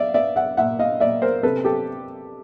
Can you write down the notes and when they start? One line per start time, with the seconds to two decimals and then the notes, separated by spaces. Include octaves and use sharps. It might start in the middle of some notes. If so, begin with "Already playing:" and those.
Already playing: D5 E5 F5
0.14 B3 D5 E5
0.36 E5 F#5
0.57 A#2 E5 F#5
0.79 D#5 F5
1.00 A#2 D5 E5
1.22 A#4 C5
1.43 C3 A4 B4
1.64 G4 A4